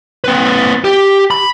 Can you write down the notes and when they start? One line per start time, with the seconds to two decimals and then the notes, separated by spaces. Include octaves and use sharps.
0.24 C4 B4
0.84 G4
1.31 B5